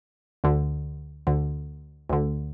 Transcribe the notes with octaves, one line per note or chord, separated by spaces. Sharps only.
D2 D3
D2 D3
D2 D3